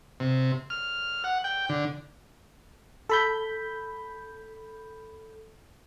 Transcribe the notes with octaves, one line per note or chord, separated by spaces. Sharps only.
C3
F6
F#5
G5
D3
A4 B5 G6